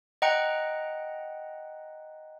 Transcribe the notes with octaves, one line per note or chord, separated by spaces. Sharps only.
D#5 F#5 G5 A#5 F#6 C#7